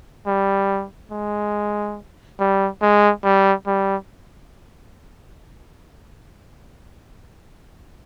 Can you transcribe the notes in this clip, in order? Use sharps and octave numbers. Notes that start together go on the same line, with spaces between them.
G3
G#3
G3
G#3
G3
G3